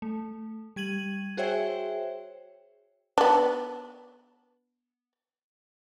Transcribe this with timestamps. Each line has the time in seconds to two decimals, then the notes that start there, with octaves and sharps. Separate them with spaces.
0.02 A3
0.76 G3 G#6 D#7 F#7
1.37 F#4 G#4 C5 C#5 E5 G5
3.18 B3 D4